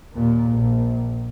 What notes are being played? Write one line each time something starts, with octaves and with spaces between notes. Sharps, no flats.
D#2 A#2
A#1